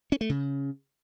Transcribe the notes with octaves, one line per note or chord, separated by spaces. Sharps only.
C#4
A3
C#3